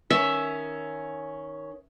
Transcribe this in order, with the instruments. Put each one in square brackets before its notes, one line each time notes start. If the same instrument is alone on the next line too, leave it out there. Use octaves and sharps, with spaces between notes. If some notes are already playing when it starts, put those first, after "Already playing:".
[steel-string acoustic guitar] D#3 C#4 [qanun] E5